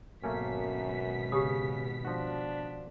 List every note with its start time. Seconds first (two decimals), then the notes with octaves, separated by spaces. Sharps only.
0.24 G#1 F#2 B2 A3 A#3 C#4 B6
1.32 C#3 G4 D#6
2.05 F3 D4 F#4